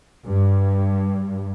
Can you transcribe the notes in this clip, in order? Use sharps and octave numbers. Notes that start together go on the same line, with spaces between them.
G2